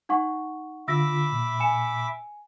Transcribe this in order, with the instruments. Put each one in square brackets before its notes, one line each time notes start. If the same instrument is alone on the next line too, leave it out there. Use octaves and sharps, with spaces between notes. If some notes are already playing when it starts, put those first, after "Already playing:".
[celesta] D#4 F#5 C#6
[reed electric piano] D3 F4 [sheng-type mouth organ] E5 B5 D6 [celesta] E6 A#6
[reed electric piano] A#2
[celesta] G#5 C#7 E7